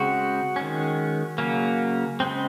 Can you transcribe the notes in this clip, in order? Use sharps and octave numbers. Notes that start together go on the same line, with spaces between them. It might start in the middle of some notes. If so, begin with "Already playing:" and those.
Already playing: C#3 G#3 C4 F#4
D#3 G#3 C#4
C#3 F#3 A#3 C#4
C#3 G#3 C4